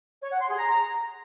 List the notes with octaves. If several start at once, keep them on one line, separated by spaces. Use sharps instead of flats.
C#5
F#5
C6
G#4
A#5